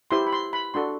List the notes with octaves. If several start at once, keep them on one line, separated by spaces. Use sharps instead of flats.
E4 G4 C5 C6
B5
C6
B5
D4 F#4 A4 C6